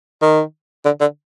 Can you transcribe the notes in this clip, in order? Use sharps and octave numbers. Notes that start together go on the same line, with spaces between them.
D#3
D3
D3